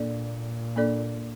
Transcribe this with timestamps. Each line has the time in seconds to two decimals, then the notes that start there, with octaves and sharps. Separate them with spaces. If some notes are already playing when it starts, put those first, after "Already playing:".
Already playing: A#2 A#3 D4 A4 D5
0.76 A#3 D4 A4 D5